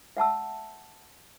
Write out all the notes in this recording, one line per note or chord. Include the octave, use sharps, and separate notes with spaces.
E5 F#5 A5 E6